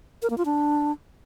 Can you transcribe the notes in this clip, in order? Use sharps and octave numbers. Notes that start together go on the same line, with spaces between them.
A#4
A#3
F4
D4